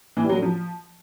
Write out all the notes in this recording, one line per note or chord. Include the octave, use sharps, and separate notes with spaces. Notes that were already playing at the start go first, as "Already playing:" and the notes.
E3
G3
F#3
D3
F3